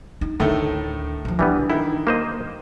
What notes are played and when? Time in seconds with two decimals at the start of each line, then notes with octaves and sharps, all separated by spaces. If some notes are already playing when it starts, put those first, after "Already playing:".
0.21 D#4
0.40 D2 A2 D3 D#3 A3
1.25 E3 F3
1.39 E3 G3 B3 D4
1.70 D#3 E4
2.07 A#3 C5 D#5